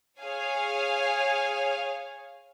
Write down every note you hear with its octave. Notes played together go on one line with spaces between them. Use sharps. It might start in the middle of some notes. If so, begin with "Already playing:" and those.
G#4 C#5 F5 G#5